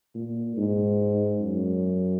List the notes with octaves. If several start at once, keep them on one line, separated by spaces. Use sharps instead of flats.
A#2
G#2
F#2